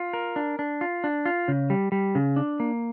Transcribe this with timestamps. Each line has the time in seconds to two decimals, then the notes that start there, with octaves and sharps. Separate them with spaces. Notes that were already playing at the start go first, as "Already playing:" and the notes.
Already playing: F4
0.13 A#4
0.36 D4
0.59 D4
0.81 F4
1.04 D4
1.26 F4
1.48 C#3
1.70 G3
1.92 G3
2.15 C#3
2.36 D4
2.60 A#3